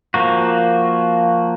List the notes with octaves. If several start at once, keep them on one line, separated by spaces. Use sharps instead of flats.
F3 A#3 F#4